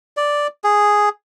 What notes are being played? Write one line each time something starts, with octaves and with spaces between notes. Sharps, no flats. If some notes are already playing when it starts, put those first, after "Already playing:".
D5
G#4